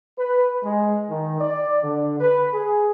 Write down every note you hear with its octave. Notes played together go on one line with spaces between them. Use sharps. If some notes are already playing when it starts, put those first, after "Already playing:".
B4
G#3
D#3
D5
D3
B4
G#4